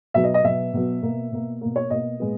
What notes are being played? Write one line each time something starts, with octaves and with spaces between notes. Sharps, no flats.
B2 F#3 B3 E5
D#5
D#5
B2 F#3 B3 E5
B2 F#3 B3
B2 A#3
B2 A#3
B2 A#3
C#5
B2 A#3 D#5
A#2 G#3 B3